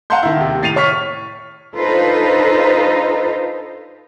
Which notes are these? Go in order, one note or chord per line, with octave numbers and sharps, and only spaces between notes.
F5 F#5 A5 A#5 C6 G6
D#3 E4
D#2 C3
A2 A6 C7 D#7 F7
C#5 C#6 F6 B6
D4 D#4 F4 A4 B4 C5